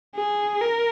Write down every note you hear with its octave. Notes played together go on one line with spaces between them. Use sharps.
G#4
A#4